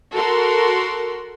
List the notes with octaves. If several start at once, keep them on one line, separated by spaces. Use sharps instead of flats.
F#4 A4 A#4 C6